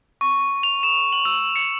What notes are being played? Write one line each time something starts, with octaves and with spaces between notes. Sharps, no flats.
C#6
F7
E7
F#7
E6
C#7